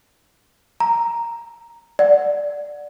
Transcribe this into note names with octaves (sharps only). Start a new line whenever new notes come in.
A#5
D5 F#5